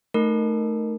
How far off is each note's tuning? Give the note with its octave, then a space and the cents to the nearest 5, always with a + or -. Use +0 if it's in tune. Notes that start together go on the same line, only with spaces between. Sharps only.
A3 +0 D#4 +0 A#4 +0